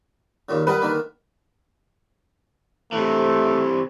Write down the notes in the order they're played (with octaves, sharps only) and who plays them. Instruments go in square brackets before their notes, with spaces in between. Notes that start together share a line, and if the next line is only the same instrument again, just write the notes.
[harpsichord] D#2 A#2 C#3
[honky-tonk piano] G3 B4 [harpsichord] A#4 D#5 F#5
[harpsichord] D3 D#3 A#3
[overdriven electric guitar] C3 E3 [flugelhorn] A3